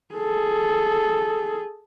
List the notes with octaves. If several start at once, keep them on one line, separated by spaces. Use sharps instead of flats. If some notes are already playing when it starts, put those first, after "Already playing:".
G#4 A4